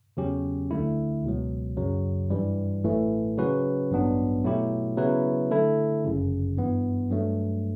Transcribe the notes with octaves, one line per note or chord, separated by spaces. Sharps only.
E2 C#3 F#3 C#4 G4
D2 D3 A3 E4
C#2 B2 F#3
F#2 C#3 F#3
G2 E3 G3
A1 A2 E3 A3
C#3 F#3 C#4 F#4 B4
A1 G2 F#3 B3 D4
B2 F#3 A3 E4 G4
C#3 F#3 B3 E4 B4
D3 A3 E4 A4
G1 F#2 C#3
G2 E3 B3
G2 F#3 A3